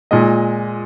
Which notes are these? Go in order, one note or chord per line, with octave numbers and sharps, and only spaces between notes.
A#2 G#3 D#5